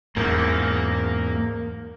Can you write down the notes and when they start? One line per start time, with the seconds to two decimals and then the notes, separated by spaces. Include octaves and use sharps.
0.16 E2 G#2 A#3